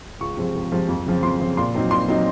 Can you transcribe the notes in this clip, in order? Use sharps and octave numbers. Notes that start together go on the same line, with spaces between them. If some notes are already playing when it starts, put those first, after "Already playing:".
C#2 C#6
C3 F3 G#3 C4
C#2
C3 F3 G#3 C4
F2
C#3 F3 C4
F2 C6
C#3 F3 C4
A#2 C6
F#3 C4 D#4
A#2 C6
F#3 C4 D#4